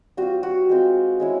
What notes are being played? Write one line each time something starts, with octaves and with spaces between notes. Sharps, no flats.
G3 C4 F4 F#4
F#4
G#3 C4 F4
G#3 C#4 E4